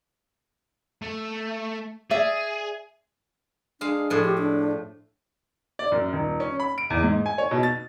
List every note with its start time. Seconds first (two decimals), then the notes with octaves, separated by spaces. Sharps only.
1.02 A3
2.11 G#4 D5 E5
3.81 G#3 D4 F5
4.10 A2 F3
4.24 G4
4.38 D4
5.79 D5
5.92 F#2
6.13 D#1
6.40 C#4
6.60 B5
6.78 D7
6.90 E2
7.03 G#2
7.26 G#5
7.38 C#5
7.51 B2
7.63 A6